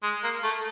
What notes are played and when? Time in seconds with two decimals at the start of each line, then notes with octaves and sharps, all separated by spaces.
0.03 G#3
0.23 A#3
0.43 A3